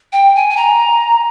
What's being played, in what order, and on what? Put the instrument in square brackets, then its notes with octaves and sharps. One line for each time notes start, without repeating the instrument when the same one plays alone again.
[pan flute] G5
G#5
G#5
A#5